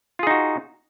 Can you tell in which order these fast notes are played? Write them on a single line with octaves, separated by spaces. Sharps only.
F4 G#4 D#4 F#4